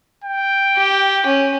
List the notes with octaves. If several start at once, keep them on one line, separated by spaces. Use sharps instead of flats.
G5
G4
C#4